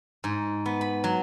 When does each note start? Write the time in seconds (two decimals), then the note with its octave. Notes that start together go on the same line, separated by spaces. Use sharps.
0.24 G#2
0.66 B3
0.81 B5
1.04 F#3